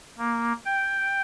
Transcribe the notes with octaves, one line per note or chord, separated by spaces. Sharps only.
A#3
G5